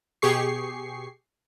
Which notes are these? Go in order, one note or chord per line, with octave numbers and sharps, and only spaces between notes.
B2 G4 G#4 C#6 C7